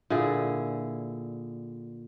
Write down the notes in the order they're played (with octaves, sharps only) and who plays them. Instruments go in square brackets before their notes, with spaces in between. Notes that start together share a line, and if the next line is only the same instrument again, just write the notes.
[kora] A#2 D3 E4 G#4